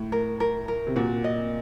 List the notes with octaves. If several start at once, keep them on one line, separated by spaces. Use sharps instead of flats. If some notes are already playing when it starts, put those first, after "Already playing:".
Already playing: A2
A#4
A#4
A#4
C3
A#2 F#4
D#5